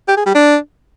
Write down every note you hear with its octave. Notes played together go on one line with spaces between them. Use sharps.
G4
G#4
G3
D4